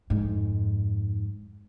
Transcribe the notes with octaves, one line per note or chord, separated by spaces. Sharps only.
F2 G#2